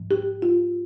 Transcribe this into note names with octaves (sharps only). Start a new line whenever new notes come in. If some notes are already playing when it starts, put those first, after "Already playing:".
Already playing: G#2 F3
G4
F4